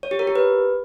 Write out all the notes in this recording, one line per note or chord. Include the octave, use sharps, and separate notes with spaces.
C#5
G4
A#4
G4
B4